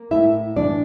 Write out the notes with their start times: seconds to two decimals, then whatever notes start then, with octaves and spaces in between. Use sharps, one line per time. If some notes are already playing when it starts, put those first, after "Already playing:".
Already playing: A#3
0.11 A2 E4 E5
0.56 E3 D4 D5